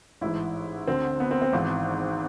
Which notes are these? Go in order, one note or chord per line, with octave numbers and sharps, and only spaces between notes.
A1 G#2 E3 E4
D2 D3 C4
B3
C4
C4
G#1 G#2 E3